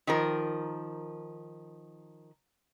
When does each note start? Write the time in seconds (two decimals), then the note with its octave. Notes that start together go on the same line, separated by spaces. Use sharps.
0.07 D#3 F3 A#4